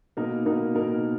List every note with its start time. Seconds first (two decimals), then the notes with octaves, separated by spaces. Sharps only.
0.17 B2 A#3 D#4 A#4
0.46 B2 A#3 D#4 A#4
0.75 B2 A#3 D#4 A#4